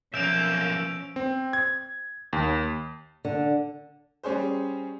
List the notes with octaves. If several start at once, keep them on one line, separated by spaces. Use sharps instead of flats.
B1 F3 A#3 C#4 E5 G6 D7 F7
C4
G#6
D#2
D3
G3 C#4 G#4 C5